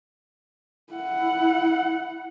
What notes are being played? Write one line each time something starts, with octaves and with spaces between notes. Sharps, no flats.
E4 F#5